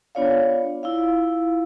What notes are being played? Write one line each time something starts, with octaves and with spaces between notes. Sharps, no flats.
B3 D4 F4 C#5 D5 F5
E4 F4 F5